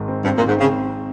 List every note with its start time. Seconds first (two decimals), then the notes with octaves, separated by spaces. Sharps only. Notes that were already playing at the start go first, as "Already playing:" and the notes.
Already playing: G#1 G#2
0.08 C4
0.25 G2 C4
0.37 A#2
0.41 G#1
0.48 G#2
0.57 C#3 C4